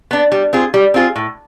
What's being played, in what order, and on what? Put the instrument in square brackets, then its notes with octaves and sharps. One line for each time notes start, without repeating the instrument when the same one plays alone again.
[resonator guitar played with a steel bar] B3 D4
G3
C4 F4 G#4
G3
C4 F4 G#4
A2